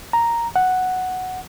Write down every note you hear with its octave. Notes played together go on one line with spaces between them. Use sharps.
A#5
F#5